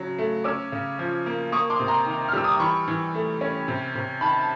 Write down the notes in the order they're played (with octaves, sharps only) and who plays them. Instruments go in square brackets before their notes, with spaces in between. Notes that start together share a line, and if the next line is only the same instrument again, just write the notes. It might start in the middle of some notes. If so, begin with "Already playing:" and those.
Already playing: [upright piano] C#3 F#3
A3
C#4 D6 E6
C#3
F3
A#3
A#3 C#6 D#6
C6 D6
C3
A#5 C6
D#3
F6
G3 E6
D#6
D6
E3 B5 C#6
E3
A3
C#4
C3
C3
D#3 A5 B5